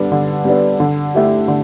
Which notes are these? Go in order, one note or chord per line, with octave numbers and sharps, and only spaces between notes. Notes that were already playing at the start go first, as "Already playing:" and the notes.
Already playing: D3 G3 B3 D4
D3
G3 B3 D4
D3
A3 E4 G4
D3